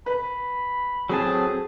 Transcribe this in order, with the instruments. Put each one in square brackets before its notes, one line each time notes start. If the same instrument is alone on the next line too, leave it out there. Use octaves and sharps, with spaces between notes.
[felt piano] B4 [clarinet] B5
[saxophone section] A2 G#4 [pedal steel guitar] F#3 C4 A5